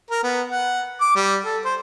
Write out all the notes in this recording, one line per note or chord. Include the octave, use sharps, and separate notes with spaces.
A#4
B3
F#5
D6
G3
A4
C5